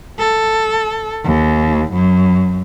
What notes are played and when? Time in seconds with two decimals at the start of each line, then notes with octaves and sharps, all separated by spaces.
0.19 A4
1.25 D#2
1.93 F#2